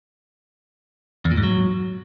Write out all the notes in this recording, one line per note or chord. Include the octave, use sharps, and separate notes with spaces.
E2
A#2
G#2
F#3